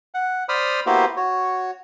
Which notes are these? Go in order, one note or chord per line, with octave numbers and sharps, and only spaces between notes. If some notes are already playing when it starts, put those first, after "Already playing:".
F#5
C5 D5 B5 D#6 F6
A#3 B3 E4 F#4 G4 C5
F#4 C#5